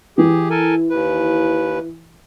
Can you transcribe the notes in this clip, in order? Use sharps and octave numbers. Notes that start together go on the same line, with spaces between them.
E3 G4 G#4
A4 A#4 G#5
D#2 B4